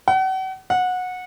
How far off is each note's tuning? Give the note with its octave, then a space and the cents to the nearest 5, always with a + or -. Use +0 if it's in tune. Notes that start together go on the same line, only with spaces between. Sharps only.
F#5 +40
F#5 -20